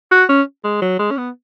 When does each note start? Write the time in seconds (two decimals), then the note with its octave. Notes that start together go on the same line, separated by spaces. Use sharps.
0.12 F#4
0.29 C#4
0.64 G#3
0.82 F#3
0.99 G#3
1.11 C#4
1.18 B3